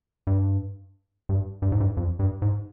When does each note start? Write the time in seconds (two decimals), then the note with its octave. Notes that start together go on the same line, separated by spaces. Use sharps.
0.27 G2
1.29 G2
1.62 G2
1.72 G#2
1.80 G2
1.97 F2
2.19 G2
2.42 G#2